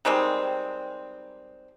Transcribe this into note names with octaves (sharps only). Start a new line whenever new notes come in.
D#3 G3 G#3 C4